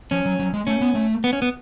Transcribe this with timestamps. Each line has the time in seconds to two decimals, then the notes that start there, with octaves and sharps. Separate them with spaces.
0.11 F3 C#4
0.25 F#3
0.39 F#3
0.53 G#3
0.67 A3 C#4
0.81 B3
0.95 A3
1.24 B3
1.33 C#4
1.42 B3